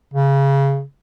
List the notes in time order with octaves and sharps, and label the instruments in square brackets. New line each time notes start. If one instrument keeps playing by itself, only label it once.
[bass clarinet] C#3